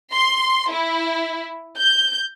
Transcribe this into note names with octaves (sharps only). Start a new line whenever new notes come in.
C6
E4
G6